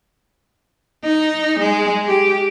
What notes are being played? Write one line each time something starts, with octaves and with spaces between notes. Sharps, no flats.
D#4
G#3
G4